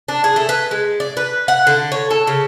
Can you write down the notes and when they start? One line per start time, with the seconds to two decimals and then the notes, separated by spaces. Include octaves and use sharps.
0.08 D4
0.24 G#4
0.36 A3
0.49 B4
0.71 G#3
1.00 D5
1.17 B4
1.48 F#5
1.67 D3
1.92 C#5
2.10 A4
2.27 C#3